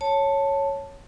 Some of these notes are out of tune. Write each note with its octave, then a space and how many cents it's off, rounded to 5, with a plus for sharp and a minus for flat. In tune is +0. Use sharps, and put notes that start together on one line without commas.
C#5 +0 A5 +5